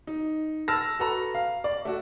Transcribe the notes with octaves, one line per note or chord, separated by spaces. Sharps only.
D#4
A5 E6 F6 A#6
F#4 A4 B4 A#5
F5
D5
A3 F#4